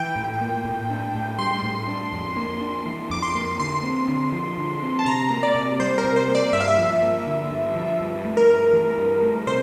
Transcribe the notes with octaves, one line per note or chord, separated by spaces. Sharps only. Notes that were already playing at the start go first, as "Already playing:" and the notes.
Already playing: E3 G5
A2
A#3
A2
D4
A2
G3 C6
A2
D4
F2
A#3
D4
E3
F2 D6
C6
A#3
D3 C6
C4
D3
F3
D3
C4
A5
C3 A#5
A#3
D5
C3
G3 C5
A#4
C3
C5
A#3
D5
G2 E5
F5
E5
F3
A#3
D3
G2
F3
G2
A3
A#4
G2
E3
G2
A3
C3 C5